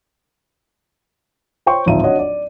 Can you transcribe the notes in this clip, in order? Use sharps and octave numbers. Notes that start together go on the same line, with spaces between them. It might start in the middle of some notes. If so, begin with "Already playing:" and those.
C5 C#5 G5 C6 C#6
D1 G#1 F3 E5 A#5 D#7
D4 F#4 C#5 D#5 F#5
D5